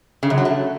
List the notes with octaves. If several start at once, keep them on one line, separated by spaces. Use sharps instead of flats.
C#3
F#2
F#3
A3